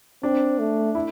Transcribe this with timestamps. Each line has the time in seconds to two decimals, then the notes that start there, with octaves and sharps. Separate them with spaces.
0.23 C4 D4
0.59 A3
0.95 E4